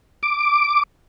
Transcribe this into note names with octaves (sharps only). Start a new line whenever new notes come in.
D6